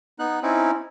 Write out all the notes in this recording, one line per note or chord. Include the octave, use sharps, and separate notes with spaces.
B3 D#4 F#6
C4 C#4 D#4 E4